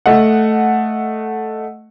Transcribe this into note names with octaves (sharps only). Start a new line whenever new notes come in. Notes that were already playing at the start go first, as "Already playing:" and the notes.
A3 D#5 F#5